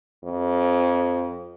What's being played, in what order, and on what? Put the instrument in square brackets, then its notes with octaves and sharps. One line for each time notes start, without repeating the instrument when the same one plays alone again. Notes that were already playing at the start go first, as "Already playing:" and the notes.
[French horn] F2